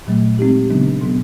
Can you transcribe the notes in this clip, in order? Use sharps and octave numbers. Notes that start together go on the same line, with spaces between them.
A#2 F#3 A3
G#3 C4 D#4 G4
C#3 F#3 B3 D4
B2 F#3 B3